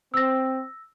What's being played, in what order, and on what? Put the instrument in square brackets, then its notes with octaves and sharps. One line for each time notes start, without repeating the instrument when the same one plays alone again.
[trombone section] C4 [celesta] E6 A#6